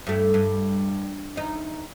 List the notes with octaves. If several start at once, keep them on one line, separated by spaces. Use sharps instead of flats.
G2 A3
G2
E2 D#4